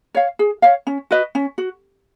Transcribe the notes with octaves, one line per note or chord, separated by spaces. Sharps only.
C#5 F5
G#4
C#5 F5
C#4
F#4 B4 D#5
C#4
F#4